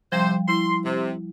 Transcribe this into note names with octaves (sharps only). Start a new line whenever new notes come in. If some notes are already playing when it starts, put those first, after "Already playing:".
C3 F3 G3 C5
E4 C6
C3